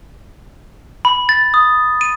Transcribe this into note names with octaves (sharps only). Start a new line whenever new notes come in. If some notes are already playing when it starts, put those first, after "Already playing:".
B5
A6
D#6
D#7